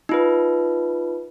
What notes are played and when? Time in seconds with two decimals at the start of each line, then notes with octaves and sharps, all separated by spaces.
0.09 D#4 F4 B4